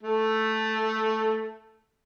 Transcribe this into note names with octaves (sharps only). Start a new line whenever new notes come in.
A3 A4